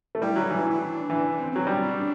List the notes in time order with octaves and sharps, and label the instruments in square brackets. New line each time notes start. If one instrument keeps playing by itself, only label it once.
[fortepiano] A3
[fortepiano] G3 [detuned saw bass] E4
[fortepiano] F#3
[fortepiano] E3 [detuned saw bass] D4
[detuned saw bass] E4
E4
D4
[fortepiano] E3
[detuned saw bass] C4
[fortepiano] F#3 [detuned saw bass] C4
[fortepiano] G3 [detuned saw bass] D4
[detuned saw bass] D4